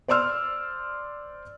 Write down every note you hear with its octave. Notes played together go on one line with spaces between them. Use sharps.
C5 D5 C6 E6 F6